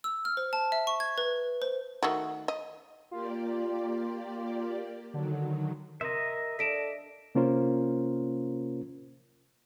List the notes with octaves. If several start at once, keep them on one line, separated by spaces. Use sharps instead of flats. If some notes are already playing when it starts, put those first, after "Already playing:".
E6
F6
C5
A5
E5
C#6
G#6
B4
C5
D#3 A3 F#4
D#5
A#3 F4 G4 D5
D3 D#3 F#3
C3 A#4 D#5 E5
D4 A4 B6 D7 E7
C3 A#3 C#4 F4 A#4 C5